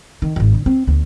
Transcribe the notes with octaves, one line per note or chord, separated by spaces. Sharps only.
D#3
D#1 G#1
D3
C4
D2 B3